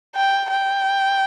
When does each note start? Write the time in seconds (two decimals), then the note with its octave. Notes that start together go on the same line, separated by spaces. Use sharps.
0.16 G5
0.51 G5